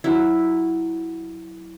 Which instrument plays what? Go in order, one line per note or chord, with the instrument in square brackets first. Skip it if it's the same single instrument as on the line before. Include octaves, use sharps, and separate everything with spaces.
[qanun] F#3 E4